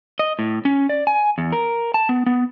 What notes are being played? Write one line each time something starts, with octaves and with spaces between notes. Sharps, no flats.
D#5
A2
C#4
D5
G#5
E2
A#4
A5
B3
B3